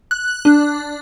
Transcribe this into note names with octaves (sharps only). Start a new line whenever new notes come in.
F#6
D4